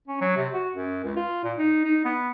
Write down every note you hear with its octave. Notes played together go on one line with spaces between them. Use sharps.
C#4
F#3
C3
F#4
F#2
C#2
F4
A#2
D#4
D#4
B3